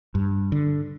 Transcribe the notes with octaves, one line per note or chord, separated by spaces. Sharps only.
G2
D3